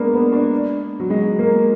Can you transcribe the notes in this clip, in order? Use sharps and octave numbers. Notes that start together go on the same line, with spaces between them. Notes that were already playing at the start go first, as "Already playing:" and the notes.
Already playing: G#3 A#3 B3 D4
B3
D4
F#3
G#3
A#3